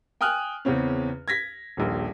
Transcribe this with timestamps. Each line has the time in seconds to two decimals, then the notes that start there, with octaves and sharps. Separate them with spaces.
0.21 G5 G#5 D#6 F6 F#6
0.65 E2 C#3 C4 C#4
1.28 G#6 A#6 B6
1.77 D#1 A#1